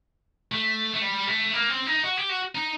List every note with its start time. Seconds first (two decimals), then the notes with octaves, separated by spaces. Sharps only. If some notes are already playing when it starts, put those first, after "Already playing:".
0.52 A3
0.94 A3
1.02 G3
1.27 A3
1.53 A#3
1.70 C4
1.87 D#4
2.04 F#4
2.17 G4
2.29 F#4
2.55 D#4